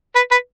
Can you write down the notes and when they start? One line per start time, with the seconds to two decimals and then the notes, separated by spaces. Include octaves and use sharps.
0.15 B4
0.31 B4